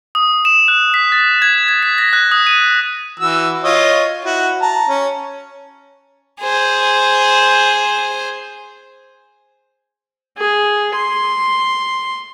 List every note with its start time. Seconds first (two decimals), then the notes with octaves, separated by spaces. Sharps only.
0.15 D#6
0.45 E7
0.68 F#6
0.94 B6
1.12 A6
1.42 G#6
1.68 G#6
1.83 B6
1.98 A#6
2.13 F#6
2.32 D#6
2.47 D#7
3.20 E3 F#4 E6
3.64 F4 C#5 D#5
4.25 E4 F#4
4.62 A5 A#5
4.89 C#4
6.41 G#4 C5
10.38 G#4
10.95 C6